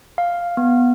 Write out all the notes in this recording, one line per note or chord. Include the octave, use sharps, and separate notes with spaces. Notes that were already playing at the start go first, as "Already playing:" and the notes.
F5
B3